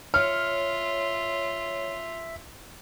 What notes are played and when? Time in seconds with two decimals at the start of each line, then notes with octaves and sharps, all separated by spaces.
0.14 F4 C#5 E5 F6